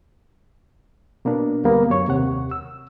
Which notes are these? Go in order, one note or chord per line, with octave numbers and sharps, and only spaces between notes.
B2 A#3 B3 D4
D2 G3 A#3 B3
F#2 C#5 C#6
D#2 C3 F#5
E6